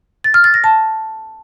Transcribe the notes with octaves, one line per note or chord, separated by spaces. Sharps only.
A6
F6
A6
A#6
A5